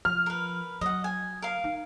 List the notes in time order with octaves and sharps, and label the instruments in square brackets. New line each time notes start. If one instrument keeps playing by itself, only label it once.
[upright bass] F3 [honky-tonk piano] F6
[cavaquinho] A#4 B4
[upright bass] F#3 [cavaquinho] D#5 F#5
[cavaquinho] G#5
A#4 F5
[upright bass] D#4